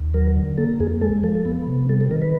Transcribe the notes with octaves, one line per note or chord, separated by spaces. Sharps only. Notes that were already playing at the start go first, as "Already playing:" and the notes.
Already playing: D#2
F#3 A#4
D3
A#3 A4
F2 G#4
G#3 A4
F3 A4
A4
B3
C3
G3 A4
A4
D#3 A#4
B4